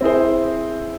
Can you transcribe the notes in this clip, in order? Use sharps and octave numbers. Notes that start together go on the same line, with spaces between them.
C4 E4 G#4 C5